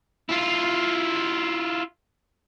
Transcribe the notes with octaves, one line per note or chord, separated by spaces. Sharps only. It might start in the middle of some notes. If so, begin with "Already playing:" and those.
E4 F4